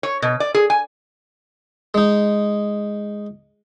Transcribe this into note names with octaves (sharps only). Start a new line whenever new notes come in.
C#5
B2
D5
G#4
G#5
G#3 D#4